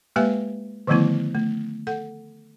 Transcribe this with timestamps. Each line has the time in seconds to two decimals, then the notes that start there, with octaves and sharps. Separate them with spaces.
0.16 G#3 A#3 G4 B4 E5 G#5
0.87 D3 D#3 F3 A3 B3 E4
1.35 A3
1.87 A4 F#5